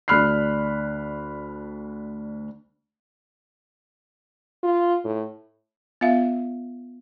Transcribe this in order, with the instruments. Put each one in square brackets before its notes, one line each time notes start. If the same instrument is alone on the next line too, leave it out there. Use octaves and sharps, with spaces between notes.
[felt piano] D2 D4 B5 F6 F#6 C7
[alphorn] F4
A2
[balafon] B3 F4 E5 F5